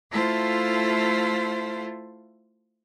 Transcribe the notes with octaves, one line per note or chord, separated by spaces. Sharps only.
A3 E4 F4 A4 C5 F5